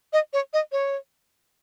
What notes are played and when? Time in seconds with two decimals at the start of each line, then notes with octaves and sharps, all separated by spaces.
0.13 D#5
0.33 C#5
0.53 D#5
0.72 C#5